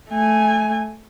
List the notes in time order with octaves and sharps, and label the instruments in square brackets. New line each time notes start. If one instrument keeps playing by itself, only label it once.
[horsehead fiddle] A3 G#5